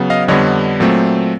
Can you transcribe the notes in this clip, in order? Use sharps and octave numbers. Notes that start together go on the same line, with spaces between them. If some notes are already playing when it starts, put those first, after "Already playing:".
Already playing: C#3 F#3 B3
D#5 F5
F2 D3 G3 B3 C#5 D#5
A#2 F#3 A3 C4